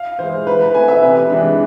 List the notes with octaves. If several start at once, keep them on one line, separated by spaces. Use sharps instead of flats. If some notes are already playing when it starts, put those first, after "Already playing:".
Already playing: F5
E3 G#3 C5
E3 B4
B4
A3 C4 G#5
E5
C3 B4
E3 G#3 D4